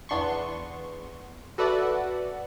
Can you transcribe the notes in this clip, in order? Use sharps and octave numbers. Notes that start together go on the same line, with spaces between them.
E2 B3 D4 C6 C#6
F#4 A4 B4 D5 E5 F#5